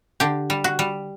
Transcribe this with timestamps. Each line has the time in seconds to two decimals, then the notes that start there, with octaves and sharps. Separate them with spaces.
0.20 D3 G4
0.50 G3
0.64 F#4
0.79 G3